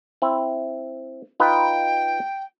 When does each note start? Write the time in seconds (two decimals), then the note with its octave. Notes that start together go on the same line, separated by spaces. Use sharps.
0.22 C4 E4
1.40 D#4 F4 B4 G5